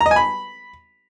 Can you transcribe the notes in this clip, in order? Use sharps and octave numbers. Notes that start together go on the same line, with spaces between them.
A#5
D#5
G#5
B5